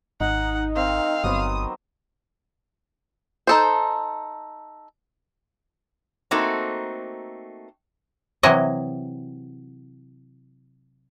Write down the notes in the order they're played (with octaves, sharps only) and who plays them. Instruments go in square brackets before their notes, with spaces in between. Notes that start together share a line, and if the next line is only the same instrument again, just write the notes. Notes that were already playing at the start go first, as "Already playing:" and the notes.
[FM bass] G#1 [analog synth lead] D#4 [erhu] F#5
[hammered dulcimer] D#3 C4 [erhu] F5
[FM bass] G1 [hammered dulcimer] F#3 B3 C4 [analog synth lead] D#6
[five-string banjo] D#4 A4 C5
[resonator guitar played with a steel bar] A3 A#3 C4 D#4 F#4 A4
[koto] C3 E3 F#3 D#5